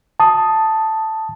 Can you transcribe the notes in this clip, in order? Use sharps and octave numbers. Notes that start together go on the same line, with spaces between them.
A5 D#6